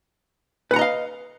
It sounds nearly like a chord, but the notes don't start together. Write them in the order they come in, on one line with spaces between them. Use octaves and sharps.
B4 F#5 A#5 D#5 F5